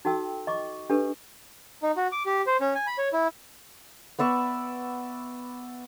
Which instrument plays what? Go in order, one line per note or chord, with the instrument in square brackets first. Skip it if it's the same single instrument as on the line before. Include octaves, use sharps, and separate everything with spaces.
[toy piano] D#4 F#4 A4 G5 E6
D#5 C#6 D6
D4 G4 A4 B4
[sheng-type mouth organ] D#4
F#4
D6
G4
C5
C#4
G#5
B5
C#5
E4
[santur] B3 D5 E5 C#6